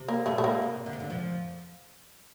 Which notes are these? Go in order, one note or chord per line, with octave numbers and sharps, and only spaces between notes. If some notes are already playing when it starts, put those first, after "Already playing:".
Already playing: C3
A#3
A#2 A3
A3
A#3
C3
D3
C3
D2 D3
F2 F3